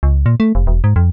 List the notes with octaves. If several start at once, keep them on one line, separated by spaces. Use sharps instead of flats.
C#2
A#2
A3
F1
E1
G#2
F2